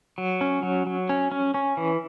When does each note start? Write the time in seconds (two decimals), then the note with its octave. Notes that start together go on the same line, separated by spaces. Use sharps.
0.18 F#3
0.41 C#4
0.63 F#3
0.87 F#3
1.09 C#4
1.32 C#4
1.54 C#4
1.77 E3